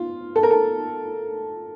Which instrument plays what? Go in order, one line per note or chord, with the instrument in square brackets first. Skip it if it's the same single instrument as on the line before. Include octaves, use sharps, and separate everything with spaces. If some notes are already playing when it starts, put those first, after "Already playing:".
Already playing: [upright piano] F4
A4
A#4
A4